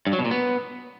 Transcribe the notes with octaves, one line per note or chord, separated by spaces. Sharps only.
G2
F#3
B2
A#2
B3